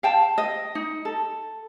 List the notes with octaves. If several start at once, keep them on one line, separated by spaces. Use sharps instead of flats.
F5 G5 A5
D#5
D#4
A4